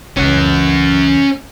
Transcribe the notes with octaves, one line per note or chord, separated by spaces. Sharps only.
C#2 E3 C#4 F#5